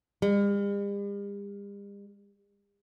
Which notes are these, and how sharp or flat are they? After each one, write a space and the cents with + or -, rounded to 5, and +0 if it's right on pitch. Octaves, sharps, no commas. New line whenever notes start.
G3 +45